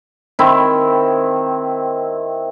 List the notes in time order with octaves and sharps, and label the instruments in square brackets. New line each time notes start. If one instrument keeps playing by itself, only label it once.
[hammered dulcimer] D#3 C4 E4